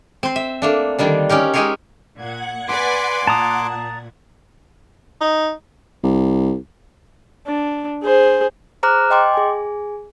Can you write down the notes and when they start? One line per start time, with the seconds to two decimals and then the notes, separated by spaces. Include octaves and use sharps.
0.23 C4 C5
0.36 E5
0.62 A3 A#3 D4
0.99 D3 D#3 G3 D4
1.29 C#4 D#4 G4 A#4
1.54 G#3 D#4 G4 G#4 A#4 C#5
2.15 A#2 F#5 F#6 G#6
2.69 B4 D5 G#5 C6 D6
3.27 A#2 A5 A#5 D#6
5.21 D#4
6.03 C2
7.47 D4
8.04 G#4 C5
8.83 G#4 C5 A#5 D6 F6 F#6
9.10 D#5 G5 C6 D6
9.34 G#4 G#5